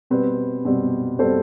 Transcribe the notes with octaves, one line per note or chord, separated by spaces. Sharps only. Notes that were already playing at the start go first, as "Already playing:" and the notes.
B2 G3 C4 B4
B2 G3 C4
B2 G3 C4 A4 C5